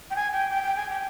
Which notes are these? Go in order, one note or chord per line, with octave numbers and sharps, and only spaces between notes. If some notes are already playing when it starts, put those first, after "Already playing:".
G5
G#5
G5
G5
G5
G#5
G5